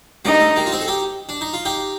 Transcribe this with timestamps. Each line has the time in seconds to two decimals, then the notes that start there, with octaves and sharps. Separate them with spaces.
0.25 G3 A#3 D#4
0.41 A3
0.56 G3 A#3
0.66 F4
0.72 C4 D#4
0.81 A4
0.88 D#4 G4
1.29 D4
1.41 D#4
1.53 F4
1.65 D#4 G4